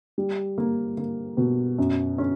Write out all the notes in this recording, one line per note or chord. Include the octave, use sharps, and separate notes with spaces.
G3
A#3
A#3
B2
F#2
C#4